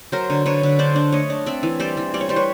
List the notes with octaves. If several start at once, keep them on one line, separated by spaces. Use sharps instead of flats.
F#3 A#4 C5
D3
D3 B4 C#5
D3
D4 C5 D5
D4
A3 C#5 D#5
D4
C4 D5 E5
E3
G3 C5 D5
E3
G3 D5
C#5
G3 C5
B4 C#5